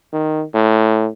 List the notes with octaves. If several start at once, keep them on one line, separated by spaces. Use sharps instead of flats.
D#3
A2